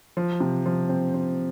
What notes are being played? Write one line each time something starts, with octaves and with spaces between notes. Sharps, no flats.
F3
C3
F3
C4
C4